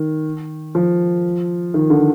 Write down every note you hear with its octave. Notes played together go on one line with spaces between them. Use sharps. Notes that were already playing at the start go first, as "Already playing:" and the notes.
Already playing: D#3
F3
D#3
D3